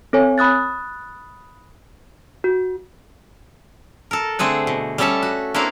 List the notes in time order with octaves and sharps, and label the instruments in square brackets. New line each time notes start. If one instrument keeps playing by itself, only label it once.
[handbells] C4 A4 C#5 G#5
B5 D#6 F#6 A6
F#4
[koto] A4 A#4
D3 A3 C4 G#4 F#5
B2
G3 C#4 A4 C#5 E5 A5
F#4
A#3 C4 D4 E4 F5 A#5